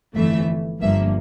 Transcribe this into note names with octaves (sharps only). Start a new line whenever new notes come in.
G1 F2 E3 A3 E5
G1 G2 F3 A#3 E5